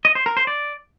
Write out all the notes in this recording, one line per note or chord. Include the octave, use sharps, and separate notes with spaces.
D#5
C5
A#4
C5
D5